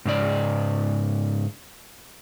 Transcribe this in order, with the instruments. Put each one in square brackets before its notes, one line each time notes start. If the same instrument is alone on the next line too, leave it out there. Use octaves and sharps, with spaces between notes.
[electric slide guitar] G#2 C#3 D5